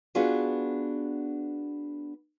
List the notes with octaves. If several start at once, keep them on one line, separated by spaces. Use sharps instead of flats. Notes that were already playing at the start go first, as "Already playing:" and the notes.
B3 D4 F4 F#4 G#4